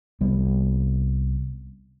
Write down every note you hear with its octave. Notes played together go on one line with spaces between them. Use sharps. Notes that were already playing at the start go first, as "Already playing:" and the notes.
C2 G3 B3